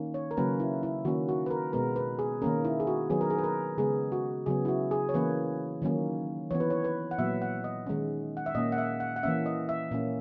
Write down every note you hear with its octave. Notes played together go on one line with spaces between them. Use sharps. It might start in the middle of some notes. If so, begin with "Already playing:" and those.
Already playing: D#3 A#3 C#4
C#5
A#4
C#3 F#3 A#3 C#4 B4
E4
E4
D#3 A#3 C#4 F#4
F#4
B4
A#4
B2 G#3 B3 A#4
B4
G#4
D#3 A#3 C#4 A#4
E4
G#4
F#4
D#3 F#3 B3 G#4
A#4
G#4
B4
A#4
C#3 G#3 B3 G#4
F#4
C#3 F#3 B3 G#4
E4
F#4
G#4
C#5
E3 A#3 C#4 B4
D#3 F#3 A#3 C#4
E3 B3 C#5
B4
C#5
B4
F#5
A#2 F#3 B3 E5
F#5
D#5
D#3 G#3 C#4
F#5
E5
A#2 A#3 C#4 D#5
F#5
E5
F#5
F#5
E3 A#3 C#4 E5
D#5
E5
A#2 A#3 C#4